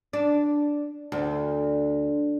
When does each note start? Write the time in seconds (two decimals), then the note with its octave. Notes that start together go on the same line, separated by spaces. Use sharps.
0.13 D4
1.12 D2